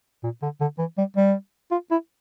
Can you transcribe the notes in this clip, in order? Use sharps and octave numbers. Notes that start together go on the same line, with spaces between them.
A#2
D3
D3
E3
G3
G3
F4
E4